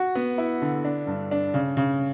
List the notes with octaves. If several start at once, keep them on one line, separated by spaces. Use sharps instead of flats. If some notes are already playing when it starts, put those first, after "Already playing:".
Already playing: F#4
B3
E4
D3
D4
G2
D4
C#3
C#3